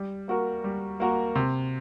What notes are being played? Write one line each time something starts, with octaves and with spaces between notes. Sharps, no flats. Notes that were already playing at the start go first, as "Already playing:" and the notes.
Already playing: G3
A#3 F#4 A#4
G3
A#3 F#4 A#4
C3